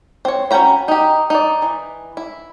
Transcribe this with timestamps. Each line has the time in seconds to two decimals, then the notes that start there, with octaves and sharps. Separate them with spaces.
0.25 C4 C#5
0.51 C#4 F#4 G5 A#5 B5
0.88 D#4 G4
1.30 D#4 D5
1.62 E3
2.17 E4